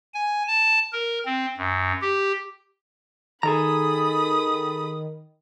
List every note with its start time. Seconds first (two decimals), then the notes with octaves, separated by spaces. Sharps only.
0.14 G#5
0.48 A5
0.93 A#4
1.26 C4
1.58 F#2
2.02 G4
3.43 D#3 G#4 A4 A#5 B5 D#6